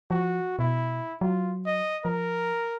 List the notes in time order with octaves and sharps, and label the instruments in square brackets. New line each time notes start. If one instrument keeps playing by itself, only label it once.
[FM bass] F3 [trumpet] F#4
[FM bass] B2 [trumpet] E4
[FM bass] F#3 [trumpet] F4
[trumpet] D#5
[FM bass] F3 [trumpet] A#4